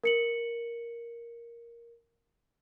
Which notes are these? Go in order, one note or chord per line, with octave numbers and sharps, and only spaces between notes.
A#4 C#7 F#7